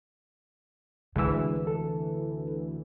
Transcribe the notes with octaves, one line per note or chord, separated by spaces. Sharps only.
D2 C3 E3 G#3 E6
A4